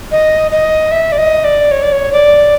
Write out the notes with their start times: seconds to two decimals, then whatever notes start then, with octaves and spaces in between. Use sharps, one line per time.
0.12 D#5
0.51 D#5
0.92 E5
1.12 D5
1.18 D#5
1.44 D5
1.71 C#5
1.83 D5
1.92 C#5
2.12 D5